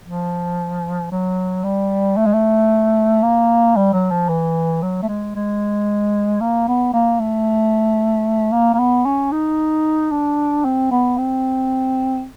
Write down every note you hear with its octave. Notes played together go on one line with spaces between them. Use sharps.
F3
F#3
G3
A3
G#3
A3
A#3
G3
F#3
F3
E3
F#3
A3
G#3
G#3
A#3
B3
A#3
A3
A#3
A#3
B3
C#4
D#4
D4
C4
B3
C4